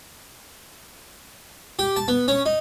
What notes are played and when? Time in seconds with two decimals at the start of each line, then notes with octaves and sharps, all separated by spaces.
1.79 G4
1.96 A5
2.08 B3
2.28 C#4
2.46 D#4